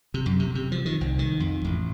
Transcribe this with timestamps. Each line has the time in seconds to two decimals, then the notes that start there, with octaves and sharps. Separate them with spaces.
0.14 C3
0.26 F#2
0.40 C3
0.55 C3
0.72 F3
0.85 D#3
1.01 C2
1.19 D#3
1.40 F2
1.64 A1